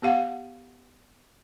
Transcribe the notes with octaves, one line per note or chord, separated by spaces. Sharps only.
B3 G4 F5 F#5